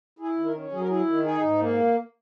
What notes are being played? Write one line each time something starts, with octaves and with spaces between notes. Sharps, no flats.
E4 G#4
D#3
A#4
C#4
F#3 G#4
A#4
E4 G#4
D#3
D#4 G#4
G#2
A#3